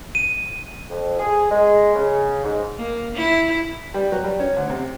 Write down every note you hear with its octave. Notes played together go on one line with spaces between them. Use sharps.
D#7
F2
G#4
G#3
C#3
G#2
A#3
E4
G3
F#3
G3
C#4
D2
C3